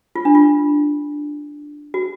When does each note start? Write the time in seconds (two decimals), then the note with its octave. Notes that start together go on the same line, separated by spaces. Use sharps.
0.15 F4
0.25 D4
0.35 F4
1.94 F#4